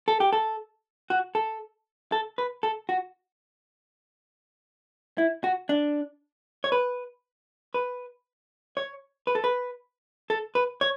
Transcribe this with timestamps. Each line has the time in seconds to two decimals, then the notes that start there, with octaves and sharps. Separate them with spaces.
0.08 A4
0.20 G4
0.33 A4
1.10 F#4
1.35 A4
2.12 A4
2.38 B4
2.63 A4
2.89 F#4
5.18 E4
5.44 F#4
5.69 D4
6.64 C#5
6.72 B4
7.74 B4
8.77 C#5
9.27 B4
9.35 A4
9.44 B4
10.30 A4
10.55 B4
10.81 C#5